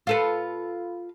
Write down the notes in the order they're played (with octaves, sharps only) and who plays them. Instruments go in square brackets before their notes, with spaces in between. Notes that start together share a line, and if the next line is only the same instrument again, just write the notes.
[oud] F4 A4 B4